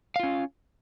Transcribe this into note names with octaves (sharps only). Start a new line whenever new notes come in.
C#4 F4 F5